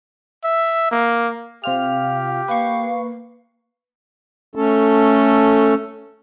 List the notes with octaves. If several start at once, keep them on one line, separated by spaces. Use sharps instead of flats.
E5
A#3
C3 F4 G4 F5 F6
A#3 B4 F5 C#6
A3 C#4 A4